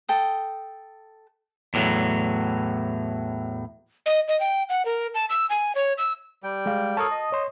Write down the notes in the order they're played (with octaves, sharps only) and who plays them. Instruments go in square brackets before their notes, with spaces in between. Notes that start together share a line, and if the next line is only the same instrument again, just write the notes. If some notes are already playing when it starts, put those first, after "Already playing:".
[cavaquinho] A4 G5 D#6
[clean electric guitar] E2 A2 F#3
[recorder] D#5
D#5
G5
F#5
A#4
A5
E6
G#5
C#5
E6
[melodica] G3 G5
[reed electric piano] G#3 F5
[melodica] A4 A#4 C#5 [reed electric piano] A5 D#6
[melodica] D#5
[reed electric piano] C#5 C6